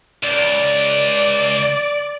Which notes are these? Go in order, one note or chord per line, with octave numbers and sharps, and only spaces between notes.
C#2 D5